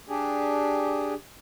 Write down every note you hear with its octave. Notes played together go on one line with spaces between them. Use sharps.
D4 G4 G#4